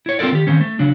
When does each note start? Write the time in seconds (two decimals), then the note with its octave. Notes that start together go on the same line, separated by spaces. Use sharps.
0.06 E4 C#5
0.19 C4 F4 A4 A#4 D5
0.32 D#3 G4
0.47 D#3 C4 C#4
0.61 A3
0.79 C#3 F#3 D4